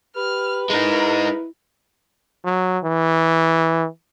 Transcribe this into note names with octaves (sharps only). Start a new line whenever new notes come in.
G4 B4 F6
G#3 D#4 E4 A#4
F#3
E3